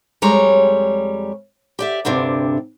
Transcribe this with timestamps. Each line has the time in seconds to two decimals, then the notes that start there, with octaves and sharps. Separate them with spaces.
0.22 F2 G3 G#3 C#5 A#5
1.79 G4 D5 E5
2.05 D2 G2 C3 D4